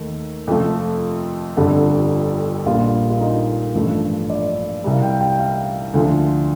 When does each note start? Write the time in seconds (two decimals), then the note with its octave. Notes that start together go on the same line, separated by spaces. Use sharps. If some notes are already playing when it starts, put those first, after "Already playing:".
Already playing: D#2 D#3 A3
0.48 F2 C3 F3 A3
1.57 G1 F2 D3 G3 A4
2.66 A#1 A#2 G3 F4
3.10 F4
3.21 D#4
3.75 A1 G2 F3 A3
4.30 D5
4.84 C2 C3 G3
4.93 F5
5.02 G5
5.21 G5
5.39 F5
5.94 D2 D3 F3